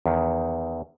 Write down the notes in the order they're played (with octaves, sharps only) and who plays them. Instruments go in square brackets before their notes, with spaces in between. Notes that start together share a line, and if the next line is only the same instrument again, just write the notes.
[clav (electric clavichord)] E2 D#3